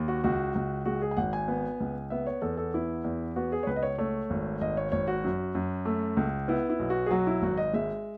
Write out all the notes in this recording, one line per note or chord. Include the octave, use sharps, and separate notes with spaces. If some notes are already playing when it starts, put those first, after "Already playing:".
Already playing: D#2
F#4
C#2 F#4
C#2
G#3 F#4
G#4
G#5
G#1 F#5
G#5
B3
C#2
B3 E5
C#5
E2 A4
A4
B3 E4
E2
B3 F#4
G#4
C#5
C#2 B4
D#5
C#5
A3 C#5
G#1
G#1 D#5
C#5
G#1 C#5
F#4
F#2
F#2
A3
C#2
B3 E4
E4
B1
F#4
G#4
F#3 F#4
E4
G#1 F#4
D#5
G#3 E5